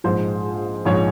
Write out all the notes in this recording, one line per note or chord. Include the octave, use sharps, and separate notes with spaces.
A#1 G#2 F3 G#3 C5
A#1 G#2 F3 G#3 C#5